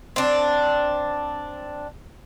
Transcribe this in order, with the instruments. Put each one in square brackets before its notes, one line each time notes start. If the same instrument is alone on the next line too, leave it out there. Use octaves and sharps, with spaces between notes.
[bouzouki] C4 D4